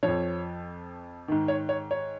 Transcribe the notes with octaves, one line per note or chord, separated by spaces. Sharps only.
F3 C#5
F2
G#2 D#3
C#5
C#5
C#5